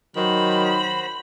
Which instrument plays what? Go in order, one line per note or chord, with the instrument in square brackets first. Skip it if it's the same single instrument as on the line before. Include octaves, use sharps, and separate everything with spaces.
[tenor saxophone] D#3 [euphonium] F#3 [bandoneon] F#4 C5 [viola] B5